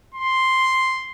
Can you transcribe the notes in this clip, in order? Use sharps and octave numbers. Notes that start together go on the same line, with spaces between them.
C6